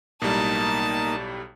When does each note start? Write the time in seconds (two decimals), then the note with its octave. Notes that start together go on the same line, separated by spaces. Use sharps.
0.22 B1 A2 G3 A#3 D#4 A5